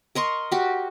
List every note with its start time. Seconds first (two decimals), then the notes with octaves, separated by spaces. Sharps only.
0.15 A#4 D#5 C6 C#6
0.52 F#4 G4